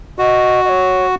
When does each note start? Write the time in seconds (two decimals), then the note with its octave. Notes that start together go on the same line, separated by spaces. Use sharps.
0.18 F#4 D#5
0.64 D#5
0.69 C#5